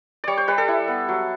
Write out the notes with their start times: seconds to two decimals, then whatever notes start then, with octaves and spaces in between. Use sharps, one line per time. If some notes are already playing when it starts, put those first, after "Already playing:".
0.24 G3 C#5 D5
0.37 C5
0.48 G3 B4
0.58 A4
0.68 E4
0.88 B3
1.09 F#3